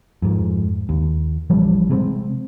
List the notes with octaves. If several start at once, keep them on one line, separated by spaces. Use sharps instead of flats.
F2 G#2
D#2
A1 E3 F3 G3
C3 G#3 A#3 C4